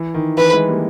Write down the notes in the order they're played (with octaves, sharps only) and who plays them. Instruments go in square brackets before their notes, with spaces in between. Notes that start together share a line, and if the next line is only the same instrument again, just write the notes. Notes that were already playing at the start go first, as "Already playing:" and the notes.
Already playing: [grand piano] E3
D#3
[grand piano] E3 [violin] B4
[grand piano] E3 G#3
G3 A#3